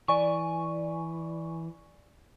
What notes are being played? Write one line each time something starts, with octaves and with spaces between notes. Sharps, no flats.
E3 D5 G#5 C#6